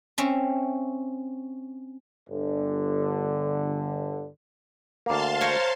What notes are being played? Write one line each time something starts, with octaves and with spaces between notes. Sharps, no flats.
C4 C#4 E5
G1 D3
D2 A#3 F5 A5 C6
A#4 C5 C#5